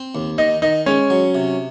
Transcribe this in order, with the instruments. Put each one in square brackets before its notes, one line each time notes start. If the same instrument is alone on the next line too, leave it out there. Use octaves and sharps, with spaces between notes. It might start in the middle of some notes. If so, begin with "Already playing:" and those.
Already playing: [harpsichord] C4
D#2
[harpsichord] D#3 [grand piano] D#4
[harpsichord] D#3 [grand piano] D#4
[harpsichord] G#3 [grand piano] C#4
[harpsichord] F#3
C3